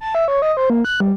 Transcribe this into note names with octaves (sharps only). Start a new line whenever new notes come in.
A5
E5
C#5
D#5
C5
A#3
F#6
G3